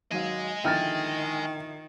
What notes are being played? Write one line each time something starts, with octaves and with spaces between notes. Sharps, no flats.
G#1 F#3 D#5 F5 G#5
A#1 D3 D#3 E4 G5 F6 A6